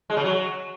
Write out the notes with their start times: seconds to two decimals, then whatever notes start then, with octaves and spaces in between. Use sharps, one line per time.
0.10 G#3
0.17 C#3
0.24 F#3